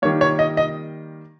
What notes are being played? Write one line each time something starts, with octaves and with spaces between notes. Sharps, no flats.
D#3 G3 A#3 C#5
C#5
D#5
D#5